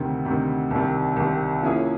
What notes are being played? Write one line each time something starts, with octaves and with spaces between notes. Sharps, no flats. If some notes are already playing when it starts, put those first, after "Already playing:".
Already playing: D2 C3 D#3
D2 C3 D#3
C2 C3 D#3
C2 C3 D#3
F3 A#3 C#4 E4 G#4